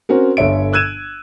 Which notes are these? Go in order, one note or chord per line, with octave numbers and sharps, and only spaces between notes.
C4 C#4 F#4 A#4
G1 D3 C#5 E5 D7
E6 F#6 G#6 D#7 E7